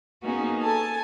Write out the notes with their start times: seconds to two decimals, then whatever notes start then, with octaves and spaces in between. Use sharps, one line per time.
0.22 A#3 B3 C#4 D#4 F#4 G#4
0.63 A4 G#5 A5